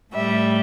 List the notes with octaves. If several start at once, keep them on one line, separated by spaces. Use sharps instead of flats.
A2 G3 E5